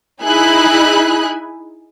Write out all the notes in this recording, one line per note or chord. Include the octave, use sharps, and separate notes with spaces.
D#4 E4 G#4 G#5 B5 F#6